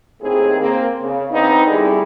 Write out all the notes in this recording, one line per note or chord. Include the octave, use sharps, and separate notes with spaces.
D#2 A2 D#3 C4 G#4
A#3 C4
C#3
D#3 B3 C4 D4 D#4
D2 D3 G3 A3 E4 G#4